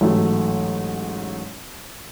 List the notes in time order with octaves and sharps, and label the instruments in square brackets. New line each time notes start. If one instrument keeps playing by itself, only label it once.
[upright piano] A1 G#2 F#3 A3